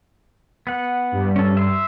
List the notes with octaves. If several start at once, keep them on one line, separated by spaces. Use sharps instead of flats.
B3 F#5
G2 G3
C#4 A4
E5 C6